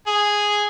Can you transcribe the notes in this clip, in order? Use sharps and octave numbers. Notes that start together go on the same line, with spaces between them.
G#4